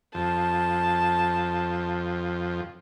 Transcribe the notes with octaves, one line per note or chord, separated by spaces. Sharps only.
F2 A5